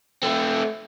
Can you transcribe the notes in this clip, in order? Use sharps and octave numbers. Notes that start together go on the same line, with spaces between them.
A3 C4